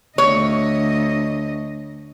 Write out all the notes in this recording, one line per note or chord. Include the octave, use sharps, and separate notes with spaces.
D2 C#5 D#5